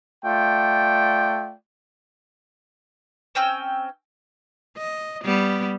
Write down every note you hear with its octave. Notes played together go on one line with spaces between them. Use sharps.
A3 F4 D5 G5
C4 C#4 G5 E6
D#5
G3 B3